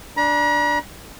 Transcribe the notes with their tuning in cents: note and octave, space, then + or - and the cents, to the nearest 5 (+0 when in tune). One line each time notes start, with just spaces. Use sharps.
D4 +0 A#5 +45